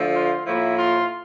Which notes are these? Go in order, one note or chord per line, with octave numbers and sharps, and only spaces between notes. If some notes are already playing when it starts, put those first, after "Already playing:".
Already playing: D3 F3 A3
F4
A2 F3 A#3 E4
F4